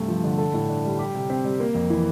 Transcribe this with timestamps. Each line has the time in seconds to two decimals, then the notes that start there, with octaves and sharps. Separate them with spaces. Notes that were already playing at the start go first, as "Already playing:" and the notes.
Already playing: G2 C3 A3
0.08 F3
0.24 D3
0.38 A4
0.54 A2
0.69 D4
0.84 G3
0.99 G4
1.15 C3
1.30 C4
1.44 G3
1.60 A#3
1.75 F2
1.90 E3